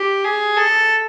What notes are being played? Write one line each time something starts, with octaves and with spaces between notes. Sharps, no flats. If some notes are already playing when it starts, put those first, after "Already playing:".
Already playing: G4
G#4
A4